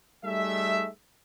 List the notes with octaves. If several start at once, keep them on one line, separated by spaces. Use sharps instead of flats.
G3 A3 D#4 G#4 E5